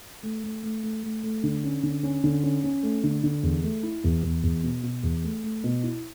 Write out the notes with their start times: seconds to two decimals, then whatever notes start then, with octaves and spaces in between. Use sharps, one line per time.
0.23 A3
0.44 A3
0.63 A3
0.83 A3
1.03 A3
1.23 A3
1.43 D3
1.64 C#4
1.83 D3
2.03 C#4
2.24 D3
2.43 C#4
2.64 C#4
2.83 A3
3.04 D3
3.24 D3
3.43 E2
3.63 A3
3.83 E4
4.04 E2
4.23 E2
4.43 E2
4.64 B2
4.83 B2
5.03 E2
5.24 A3
5.44 A3
5.64 B2
5.83 E4